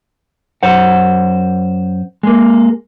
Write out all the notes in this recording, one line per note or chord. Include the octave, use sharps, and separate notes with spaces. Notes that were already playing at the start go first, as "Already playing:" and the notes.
F#2 C5 F#5
G#3 A#3